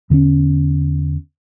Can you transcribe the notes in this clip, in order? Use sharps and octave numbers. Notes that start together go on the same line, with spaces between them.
E2 D3 B3 C#4